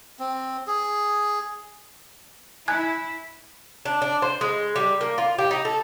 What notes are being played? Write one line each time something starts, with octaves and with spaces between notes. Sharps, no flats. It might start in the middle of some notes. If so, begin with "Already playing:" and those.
C4
G#4
E4 G#5 F#6 G#6
D4
D4
C5
G#3
G3
A#3
F4
G4
D#4
A4